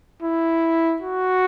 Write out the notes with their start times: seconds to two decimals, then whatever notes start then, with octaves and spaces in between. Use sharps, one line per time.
0.22 E4
1.02 F#4